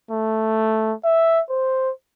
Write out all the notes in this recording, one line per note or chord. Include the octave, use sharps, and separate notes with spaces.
A3
E5
C5